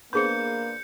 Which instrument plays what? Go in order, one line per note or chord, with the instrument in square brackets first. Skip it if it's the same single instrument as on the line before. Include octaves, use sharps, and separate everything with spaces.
[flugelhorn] A#3 [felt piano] B3 D4 C5 [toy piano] G#4 C6 [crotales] G6 C#7